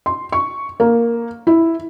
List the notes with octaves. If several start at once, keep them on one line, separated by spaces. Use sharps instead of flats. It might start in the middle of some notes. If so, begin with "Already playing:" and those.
C6
C#6
A#3
E4